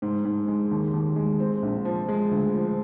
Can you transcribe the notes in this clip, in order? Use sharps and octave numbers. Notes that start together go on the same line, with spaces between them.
G#2
G#2
G#3
D#2
D#2
G#3
C4
A#1
F3
G#3
D2
F3